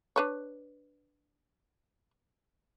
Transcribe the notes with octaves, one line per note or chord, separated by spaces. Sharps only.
D4 B4 C#5